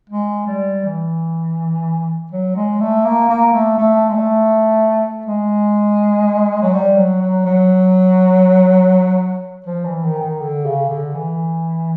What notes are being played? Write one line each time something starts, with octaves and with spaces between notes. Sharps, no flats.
G#3
G3
E3
F#3
G#3
A3
A#3
A#3
A3
A3
G#3
A3
G#3
F#3
G3
F#3
F#3
F#3
F3
E3
D#3
D#3
D3
C#3
D3
E3